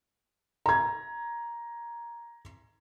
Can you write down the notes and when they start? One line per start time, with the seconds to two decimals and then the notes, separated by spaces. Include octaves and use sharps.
0.66 A#5 G#6